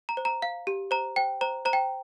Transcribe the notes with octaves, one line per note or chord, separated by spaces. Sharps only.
A#5
C5
A#5
F5
G4
C5 A#5
C5 G5
C5 A#5
C5 A#5
G5